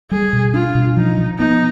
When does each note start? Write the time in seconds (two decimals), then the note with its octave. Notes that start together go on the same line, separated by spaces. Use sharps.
0.11 G3 G#4
0.33 B2
0.54 D4 F4
0.75 B2
0.97 F3 D#4
1.18 F3
1.39 B3 D#4